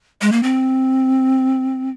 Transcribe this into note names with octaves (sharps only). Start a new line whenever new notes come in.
G#3
A#3
C4